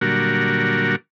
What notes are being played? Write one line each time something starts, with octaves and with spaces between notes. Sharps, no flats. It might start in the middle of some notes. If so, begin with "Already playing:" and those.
A#2 D3 F#3 G3 F#4 A#4